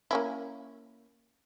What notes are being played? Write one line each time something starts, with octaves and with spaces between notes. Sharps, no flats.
A#3 C#4 E4